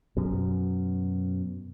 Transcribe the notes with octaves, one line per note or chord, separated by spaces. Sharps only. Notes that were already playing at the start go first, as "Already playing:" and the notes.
F#2 B2